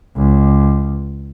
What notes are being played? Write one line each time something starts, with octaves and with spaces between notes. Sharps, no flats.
C#2